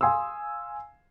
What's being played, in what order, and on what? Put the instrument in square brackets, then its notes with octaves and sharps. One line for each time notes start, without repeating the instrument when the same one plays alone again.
[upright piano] F5 G#5 C6 D#6 E6